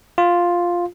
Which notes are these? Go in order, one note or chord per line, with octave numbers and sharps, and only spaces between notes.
F4